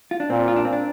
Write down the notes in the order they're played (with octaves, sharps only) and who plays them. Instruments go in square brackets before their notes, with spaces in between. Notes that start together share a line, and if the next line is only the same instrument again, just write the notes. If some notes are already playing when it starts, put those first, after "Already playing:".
[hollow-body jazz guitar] F4
D4
[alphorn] A#2 [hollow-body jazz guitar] C4
[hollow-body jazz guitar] F4
D4
C4
D4